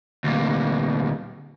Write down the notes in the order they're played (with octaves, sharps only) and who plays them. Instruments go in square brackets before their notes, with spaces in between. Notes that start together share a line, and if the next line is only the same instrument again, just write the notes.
[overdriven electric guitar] D2 A#2